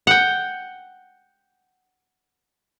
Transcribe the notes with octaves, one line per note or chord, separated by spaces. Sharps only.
F#5 G5